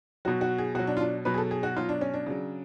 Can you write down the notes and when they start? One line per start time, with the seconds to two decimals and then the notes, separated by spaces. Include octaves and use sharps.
0.25 B2 F#3 F#4
0.41 F#4
0.58 G#4
0.75 B2 F#3 F#4
0.87 D4
0.97 F4
1.00 D4
1.25 B2 F#3 B4
1.34 G#4
1.38 A4
1.51 G#4
1.63 F#4
1.76 B2 F#3 F4
1.89 D4
2.01 C#4
2.14 D4
2.26 C#3 F#3